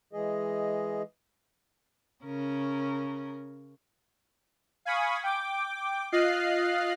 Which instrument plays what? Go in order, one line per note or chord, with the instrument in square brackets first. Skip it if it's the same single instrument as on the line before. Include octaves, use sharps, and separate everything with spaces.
[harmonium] E3 G#3 G#4 D#5
[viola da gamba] C#3 C#4 A#4
[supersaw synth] F5 G#5 B5 C#6 D#6
G5 D6
F4 D#5 F5 F#6 C7